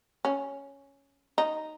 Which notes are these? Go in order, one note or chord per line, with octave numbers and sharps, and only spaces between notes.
C#4
D#4